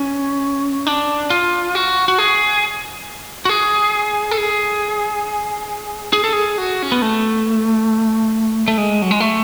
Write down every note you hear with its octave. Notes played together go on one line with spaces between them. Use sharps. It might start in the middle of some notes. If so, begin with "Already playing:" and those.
Already playing: C#4
D4
F4
F#4
F#4
G#4
F#4
G#4
A4
G#4
G#4
A4
G#4
F#4
C#4
B3
A3
A3
G#3
F#3
G#3
A3